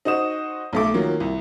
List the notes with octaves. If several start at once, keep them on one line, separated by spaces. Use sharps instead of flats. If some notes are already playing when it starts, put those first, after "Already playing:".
D#4 F#4 C5 D#6 E7
B1 A3 D6
D#3 F#3 A#3 F4
C2